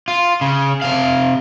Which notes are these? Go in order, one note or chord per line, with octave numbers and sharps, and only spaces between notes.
F4
C#3
C3 F5